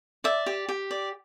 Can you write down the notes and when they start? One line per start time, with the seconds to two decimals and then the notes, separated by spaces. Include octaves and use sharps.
0.24 D5 E5
0.46 G4
0.69 G4
0.91 D5